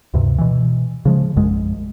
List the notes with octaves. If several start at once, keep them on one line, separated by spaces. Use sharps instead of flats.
D2 G2 C3
B2 E3
C#3 F3 G#3
A#1 F#2 G#3